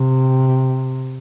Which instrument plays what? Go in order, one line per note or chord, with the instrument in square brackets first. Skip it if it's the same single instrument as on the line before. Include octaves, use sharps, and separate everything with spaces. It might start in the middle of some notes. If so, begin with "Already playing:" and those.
Already playing: [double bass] C3